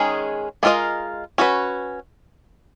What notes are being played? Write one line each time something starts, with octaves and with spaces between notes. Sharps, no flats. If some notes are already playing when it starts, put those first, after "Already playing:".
Already playing: D#3 G#3 C#4 G#4
G#3 B3 F4 A#4 D#5
C#4 F#4 B4